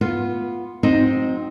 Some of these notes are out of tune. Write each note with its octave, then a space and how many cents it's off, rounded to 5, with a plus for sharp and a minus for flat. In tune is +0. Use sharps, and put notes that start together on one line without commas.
B3 -10 F4 +0
F#3 -35 C4 +0 D#4 +0